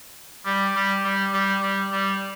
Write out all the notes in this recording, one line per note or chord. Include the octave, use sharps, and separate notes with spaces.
G3
G3
G3
G3
G3
G3